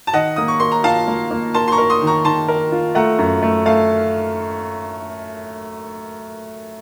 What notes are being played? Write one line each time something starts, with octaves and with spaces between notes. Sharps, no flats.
A5
D#3 D#5 F#5
A#3 D#6
C#6
A#4 C6
A#5
F4 F5 A5
A#3
A#3
A#4 A5 C6
C6
A#5 C#6
A#4
C6 D#6
D#3
A#5 C#6
D#3 A5 C6
A#4
F4
A3 F#5 A#5
F#2
A3
A3 F5 A5